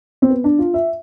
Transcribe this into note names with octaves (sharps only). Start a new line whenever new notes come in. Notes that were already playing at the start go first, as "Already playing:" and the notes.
C4
B3
D4
F4
E5